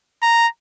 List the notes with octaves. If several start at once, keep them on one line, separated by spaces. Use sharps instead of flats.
A#5